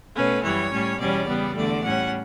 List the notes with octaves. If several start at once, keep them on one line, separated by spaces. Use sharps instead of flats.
B2 A3 C#4 B4
F#2 E3 G3 C#5
A2 G3 C#4
E2 B2 G3 C#4 D5
C#3 G3 B3
E2 D3 A3 D5
A2 G3 C#4 F#5